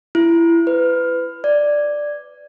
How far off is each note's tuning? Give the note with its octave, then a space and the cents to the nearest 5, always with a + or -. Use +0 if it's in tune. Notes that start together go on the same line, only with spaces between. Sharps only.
E4 +25
B4 +25
D5 +5